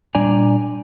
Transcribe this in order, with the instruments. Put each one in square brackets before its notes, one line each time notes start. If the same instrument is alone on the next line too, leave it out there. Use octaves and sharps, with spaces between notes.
[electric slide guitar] A#2 G3 D4 D5 G#5 A#5